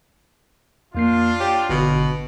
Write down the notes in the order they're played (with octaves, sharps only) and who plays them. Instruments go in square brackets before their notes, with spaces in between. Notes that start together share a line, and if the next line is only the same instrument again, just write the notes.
[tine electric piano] F2 A#3 C7 [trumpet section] D4 F4
[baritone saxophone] G4 [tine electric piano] C#5
[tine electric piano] G#1 D3 [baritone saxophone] B2